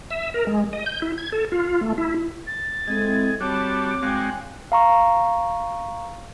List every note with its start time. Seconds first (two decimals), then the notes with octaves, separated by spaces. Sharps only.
0.11 E5
0.34 A#4
0.47 G#3
0.73 D#5
0.86 G6
1.02 E4
1.18 G#6
1.32 A4
1.52 F4
1.81 A3
1.98 E4
2.47 A6
2.87 G#3 C4 E4 G#4 A4 D#5
3.41 G3 C4 F#4 C#5 A5 B5 D6
4.03 G#3 C4 F#4 F5 G5 G#5 F#6
4.72 F5 A#5 C#6